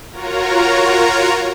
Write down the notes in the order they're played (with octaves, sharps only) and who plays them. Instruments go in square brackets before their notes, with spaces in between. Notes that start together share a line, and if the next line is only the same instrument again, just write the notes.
[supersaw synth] F4 F#4 A#4 C#5 A#5